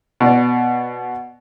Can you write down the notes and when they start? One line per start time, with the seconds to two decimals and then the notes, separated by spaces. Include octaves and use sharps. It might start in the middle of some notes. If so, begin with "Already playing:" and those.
0.20 B2 D5